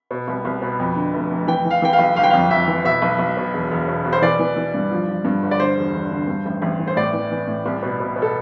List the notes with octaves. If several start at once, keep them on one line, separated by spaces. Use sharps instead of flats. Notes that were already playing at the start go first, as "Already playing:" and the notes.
B2
C2
C2
B2
F2
D3
F1
F1
E3 G5
E3
F5
E3 G5
F5
B1
G1 F5
G5
F2 F5
F2 E5
E3
B2 E5
B1
B1
B2
E1
E1
B2
B2
C5
E3 D5
E3
E3
G2
F3
F3
G2
G1
D5
D3 C5
E1
E1
D3
G2
A1
A1
E3
C5
A2 D5
E3
E3
A2
C2
B2
B2
B2
A4